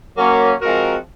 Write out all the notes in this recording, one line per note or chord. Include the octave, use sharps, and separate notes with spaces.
F#3 A#3 C#4
F3 G#3 C4 F#4 A#4